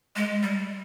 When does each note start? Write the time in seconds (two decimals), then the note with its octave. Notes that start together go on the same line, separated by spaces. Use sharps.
0.16 G#3
0.43 G3